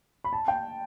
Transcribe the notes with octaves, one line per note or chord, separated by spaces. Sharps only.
B5
A5
G5